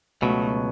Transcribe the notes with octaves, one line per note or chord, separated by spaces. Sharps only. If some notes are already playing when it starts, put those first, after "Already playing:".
C#2 B2 F#3 A3